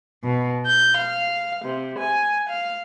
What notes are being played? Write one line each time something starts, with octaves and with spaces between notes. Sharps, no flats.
B2
G6
F5
C3
G#5
F5